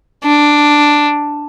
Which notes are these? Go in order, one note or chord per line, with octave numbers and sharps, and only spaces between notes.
D4